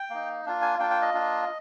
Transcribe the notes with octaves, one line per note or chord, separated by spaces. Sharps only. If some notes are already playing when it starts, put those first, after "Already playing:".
Already playing: G5
A#3 D#4
A#3 D4 F4
G#5
A#3 D4 F4 G5
G5
D#5
A#3 D4 F4